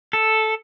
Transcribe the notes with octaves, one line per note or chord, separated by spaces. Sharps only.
A4